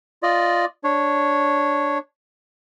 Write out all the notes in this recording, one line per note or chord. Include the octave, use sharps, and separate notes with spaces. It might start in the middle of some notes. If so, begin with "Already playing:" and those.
F4 D5 D#5
D4 C#5